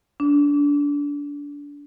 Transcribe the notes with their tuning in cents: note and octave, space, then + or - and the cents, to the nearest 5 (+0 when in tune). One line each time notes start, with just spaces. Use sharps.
D4 -25